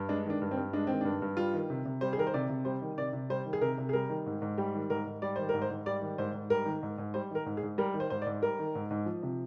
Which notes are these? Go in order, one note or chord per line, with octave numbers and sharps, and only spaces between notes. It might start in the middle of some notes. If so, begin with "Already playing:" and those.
Already playing: G2
G#3 D4
D#3 D4
G2
C4
G2
G#3 D4
D#3 C4
G2 D4
G2
G3 F4
D#3
C3
C3
G3 C5
G#4
D#3 A#4
C5
C3 D5
C3
G3 C5
D#3
C3 D5
C3
G3 C5
D#3
G#4
C3 A#4
C3
G#4
G3 A#4
D#3
G#2
G#2
G3 G4
D#3
G#2 A#4
G#2
G3 D5
D#3 C5
G#2 A#4
C5
G#2
G3 D5
D#3
G#2 C5
G#2
G3 A#4
D#3
G#2
G#2
G3 C5
D#3 A#4
G#2
G#4
G#2
G3 A#4
D#3
C5
G#2 C5
D5
G#2
G3 A#4
D#3
G#2
G#2
F3
C3